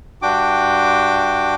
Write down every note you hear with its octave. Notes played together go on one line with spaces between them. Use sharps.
G2 D4 F#4 G5 D6